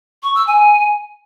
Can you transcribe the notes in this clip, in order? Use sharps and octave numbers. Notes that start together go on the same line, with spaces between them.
C#6
E6
G#5